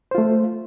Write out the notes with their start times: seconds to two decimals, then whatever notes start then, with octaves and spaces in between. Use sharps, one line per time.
0.11 C5
0.15 F4
0.18 A3